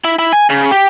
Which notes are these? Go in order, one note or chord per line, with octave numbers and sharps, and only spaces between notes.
E4
E4
G#5
C#3
G4